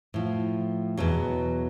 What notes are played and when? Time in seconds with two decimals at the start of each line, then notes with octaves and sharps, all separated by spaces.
0.14 A2 F3
0.97 E2 B2 F#3